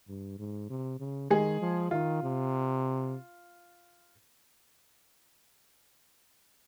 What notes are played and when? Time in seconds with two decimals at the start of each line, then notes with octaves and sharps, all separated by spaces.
0.08 G2
0.39 G#2
0.70 C3
1.00 C#3
1.30 D#3 G#3 G#4
1.61 F3
1.91 D#3 F4
2.23 C3